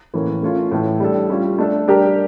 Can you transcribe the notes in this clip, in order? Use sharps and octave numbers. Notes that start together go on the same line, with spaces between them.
A2 E3 A#3 C#4
A3 C#4 F4
A2 E3 A3
G3 D4 A4
G3 C#4 F4
A3 D4 A4
G3 D4 G4 A#4